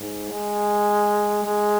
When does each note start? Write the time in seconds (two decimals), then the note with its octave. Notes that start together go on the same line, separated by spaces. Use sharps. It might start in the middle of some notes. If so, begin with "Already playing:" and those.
Already playing: G#2
0.30 G#3
1.44 G#3